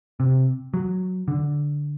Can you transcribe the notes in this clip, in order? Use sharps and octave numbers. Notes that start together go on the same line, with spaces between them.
C3
F#3
D3